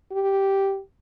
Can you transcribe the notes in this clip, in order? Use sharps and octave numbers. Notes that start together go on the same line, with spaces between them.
G4